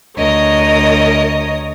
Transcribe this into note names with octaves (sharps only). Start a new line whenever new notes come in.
D2 A#4 C#5 D#5 D#6